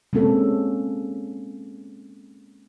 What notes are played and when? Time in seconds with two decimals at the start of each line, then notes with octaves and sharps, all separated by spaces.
0.13 G#3 A#3 C4 C#4 A4